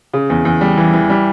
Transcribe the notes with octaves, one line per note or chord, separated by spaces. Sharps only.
C#3
E2
E2
G3
E3
E3
G3